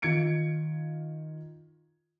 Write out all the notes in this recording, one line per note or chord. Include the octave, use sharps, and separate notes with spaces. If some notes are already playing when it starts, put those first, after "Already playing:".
D#3 F4 G#6 C#7 D7